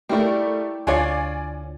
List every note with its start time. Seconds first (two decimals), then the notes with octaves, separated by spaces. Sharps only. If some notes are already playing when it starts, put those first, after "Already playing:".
0.09 G3 A3 A#3 E4 A#4 D5 G5
0.87 D2 D4 F4 C#5 D5 G#5